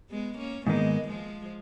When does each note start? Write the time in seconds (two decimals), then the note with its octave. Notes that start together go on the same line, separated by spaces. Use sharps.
0.10 G#3 B3
0.38 A#3 C#4
0.66 G#2 D#3 G#3 A#3 B3 D#4
1.08 F3 G#3